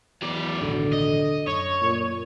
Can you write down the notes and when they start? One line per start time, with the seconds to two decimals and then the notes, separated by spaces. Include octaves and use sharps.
0.22 E2 F#3 D5
0.61 A1 D#2 B2 D3
0.93 D#5
1.47 F#2 C#5
1.81 A#2